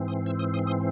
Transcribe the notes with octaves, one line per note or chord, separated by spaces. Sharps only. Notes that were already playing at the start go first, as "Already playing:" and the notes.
Already playing: G#2 E3 C4
D#6
E6
D#6
D#6
D#6